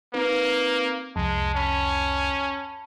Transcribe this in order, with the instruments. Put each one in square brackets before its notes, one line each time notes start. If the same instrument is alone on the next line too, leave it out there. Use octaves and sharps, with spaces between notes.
[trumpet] A#3 [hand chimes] C4 D#4 B4
[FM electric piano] C2 F2 [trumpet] G#3 [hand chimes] A5
[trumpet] C#4 [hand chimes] A5 B5 B6